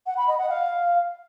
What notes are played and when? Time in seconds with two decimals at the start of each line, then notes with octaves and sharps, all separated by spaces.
0.06 F#5
0.17 B5
0.28 D#5
0.38 F#5
0.49 F5